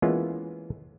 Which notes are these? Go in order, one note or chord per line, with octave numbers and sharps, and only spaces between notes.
E3 G#3 A#3 B3 C#4 F4